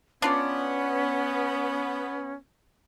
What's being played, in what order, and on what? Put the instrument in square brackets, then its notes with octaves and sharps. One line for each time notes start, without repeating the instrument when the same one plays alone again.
[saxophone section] B3 [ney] C#4 [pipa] D4 F4 D5